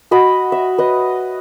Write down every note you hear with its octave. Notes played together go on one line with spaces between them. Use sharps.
F#4 D#5 B5
E5
B4 D#5